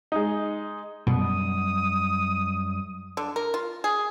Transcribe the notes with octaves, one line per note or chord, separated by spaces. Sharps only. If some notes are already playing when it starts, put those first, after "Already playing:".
G#3 D#4
F#2 B2 G3 D#6
D3
A#4
F4
G#4